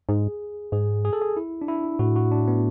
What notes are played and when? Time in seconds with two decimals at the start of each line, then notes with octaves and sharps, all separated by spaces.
0.09 G#2 G#4
0.72 G#2 G#4
1.05 G#4
1.13 A4
1.22 G#4
1.37 E4
1.62 D4
1.68 E4
1.99 A2 F#4
2.16 F#4
2.32 D4
2.48 B3